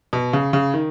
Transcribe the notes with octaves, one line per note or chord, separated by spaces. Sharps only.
B2
C#3
C#3
D#3